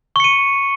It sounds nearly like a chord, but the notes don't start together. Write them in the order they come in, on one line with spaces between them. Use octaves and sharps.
C#6 C#7 D#7